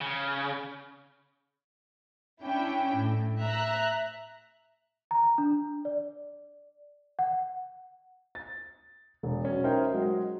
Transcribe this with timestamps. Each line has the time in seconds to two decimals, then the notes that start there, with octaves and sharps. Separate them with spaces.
0.01 C#3
2.43 C#4 D4 E4 G5
2.95 A2
3.42 E5 A#5 F#6
5.11 A#5
5.38 D4
5.85 D5
7.19 F#5
8.35 A6
9.23 E1
9.45 F#3 C#4
9.64 C#4 D#4 E4 A#4 C5 G5
9.93 F#3 G#3